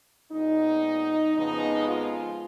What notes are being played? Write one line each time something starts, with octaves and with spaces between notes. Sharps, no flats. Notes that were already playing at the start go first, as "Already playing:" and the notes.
A#2 G#3 B3 D#4
F2 C#3 F3 G#3 B3 D#4
F4